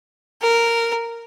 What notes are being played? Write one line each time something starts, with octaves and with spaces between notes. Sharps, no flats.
A#4